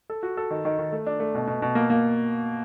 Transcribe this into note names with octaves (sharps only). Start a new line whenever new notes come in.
A4
F#4
A4
D#3
D#3
D#3
A3
D4
A3
B2
B2
B2
A#3
A#3